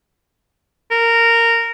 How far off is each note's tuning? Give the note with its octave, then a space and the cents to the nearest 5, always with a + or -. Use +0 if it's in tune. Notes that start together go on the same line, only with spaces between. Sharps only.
A#4 -10